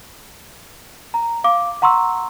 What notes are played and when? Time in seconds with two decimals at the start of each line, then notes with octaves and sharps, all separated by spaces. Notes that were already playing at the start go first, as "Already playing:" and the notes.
1.14 A#5
1.44 F5 D6
1.82 F#5 A#5 C6 C#6 E6